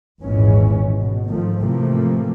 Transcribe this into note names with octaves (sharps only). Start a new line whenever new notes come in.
G#1 E2 A#2 E3 G#3 C#4
B2
G#1 D#3 F3 A3
A2 C3 E3 F3 A3 A#3